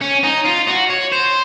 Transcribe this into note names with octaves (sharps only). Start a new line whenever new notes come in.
C#4
D#4
F4
F#4
C#5
C5